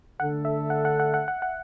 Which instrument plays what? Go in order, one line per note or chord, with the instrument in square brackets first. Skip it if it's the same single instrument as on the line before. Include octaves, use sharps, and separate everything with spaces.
[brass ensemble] D3 A3 D4 A4 [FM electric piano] F#5
[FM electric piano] E5
F#5
F#5
F#5
F#5
F#5
F#5